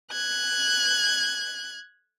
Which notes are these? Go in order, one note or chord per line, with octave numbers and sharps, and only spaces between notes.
F#6 G#6